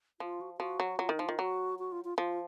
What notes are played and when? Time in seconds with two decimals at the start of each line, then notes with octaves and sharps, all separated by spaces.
0.20 F3 F4
0.41 F#4
0.57 F3 F#4
0.80 F#3
0.99 F#3 F4
1.09 D#3 D#4
1.19 F3
1.26 D#3 F4
1.39 F#3 F#4
1.79 F#4
1.92 F4
2.04 F4
2.18 F3 F4